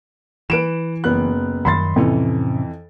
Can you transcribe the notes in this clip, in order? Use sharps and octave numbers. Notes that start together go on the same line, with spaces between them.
E3 B4 D7 E7
F#1 B3 F#6
F#2 D#3 F#3 B5 C6 A6
F2 A2 C3 E3 C#4